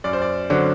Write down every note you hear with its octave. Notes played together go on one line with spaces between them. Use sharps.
F#2 D5
C5
D5
D3 F#3 C4